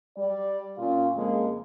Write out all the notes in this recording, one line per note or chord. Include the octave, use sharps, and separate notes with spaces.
G3 D5
A#2 C#4 F4
F2 C#3 G#3 A#3